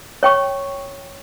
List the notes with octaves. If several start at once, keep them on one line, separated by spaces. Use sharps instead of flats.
C#5 G5 C#6